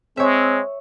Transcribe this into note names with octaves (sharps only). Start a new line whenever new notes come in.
G#3 C4 C#5 E5